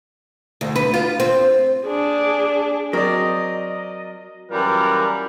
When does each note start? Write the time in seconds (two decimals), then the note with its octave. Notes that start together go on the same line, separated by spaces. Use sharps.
0.61 D2
0.76 B4
0.94 F4
1.20 C4
1.86 D4 G#4
2.93 F#3 C4 A#4 D5 D#5
4.51 F#2 E3 G3 F4 A#4